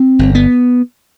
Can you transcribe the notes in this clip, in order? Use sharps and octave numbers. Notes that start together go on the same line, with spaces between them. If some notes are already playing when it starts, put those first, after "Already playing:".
Already playing: C4
G1
B3